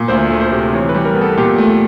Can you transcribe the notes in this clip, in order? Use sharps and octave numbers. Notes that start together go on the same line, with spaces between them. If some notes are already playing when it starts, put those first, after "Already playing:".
Already playing: A#2
D2 C5
A3
C5
C3
E3 C#5
B4
G3
A#4
B3
A4
A#2 G4
A3